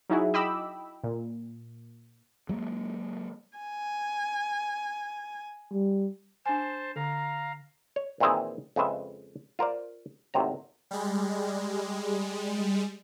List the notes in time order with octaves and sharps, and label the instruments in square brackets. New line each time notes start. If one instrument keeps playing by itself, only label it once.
[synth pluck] F#3 D#4 E4 F#4 G#4
D#5 G5 B5 D6 E6
A#2
[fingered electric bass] F#3 G#3 A#3
[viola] G#5
[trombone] G3
[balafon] D4 G#5 [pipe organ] C5 A5
[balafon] D3 [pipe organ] F5 A#5
[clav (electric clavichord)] C#5
A#2 D#3 E3 C4 E4 G#4
F2 C#3 G#3 B4 E5
F4 A#4 C5 D5
G#1 A2 C3 F#3 A#5
[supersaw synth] G3 G#3